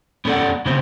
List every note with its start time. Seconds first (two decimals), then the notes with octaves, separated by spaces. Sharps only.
0.25 B3 C#4 A4 B4 D5 F#5
0.66 C#3 B3 C4